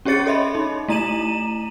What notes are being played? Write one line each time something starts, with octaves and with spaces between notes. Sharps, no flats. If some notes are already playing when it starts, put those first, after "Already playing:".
C#4 G4 G#4 C#5 A6 C#7
A4 C#5 D#5 E5 B5 C6
D#4
A3 E4 A#5 D#7 E7 F#7